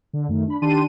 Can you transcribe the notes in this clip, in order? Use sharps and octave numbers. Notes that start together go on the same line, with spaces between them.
D3
F#2 D#3 A3
D4 B5
D#3 D4 G4 A5 C6 D#7